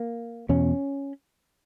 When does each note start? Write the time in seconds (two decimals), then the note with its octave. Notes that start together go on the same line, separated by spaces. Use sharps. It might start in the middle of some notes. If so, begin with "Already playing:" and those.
Already playing: A#3
0.49 E2 B2 C#4